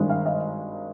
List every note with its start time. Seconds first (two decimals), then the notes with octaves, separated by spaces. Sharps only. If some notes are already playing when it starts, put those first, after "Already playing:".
Already playing: G#1 G2 D#3 G#3
0.10 F5
0.26 D#5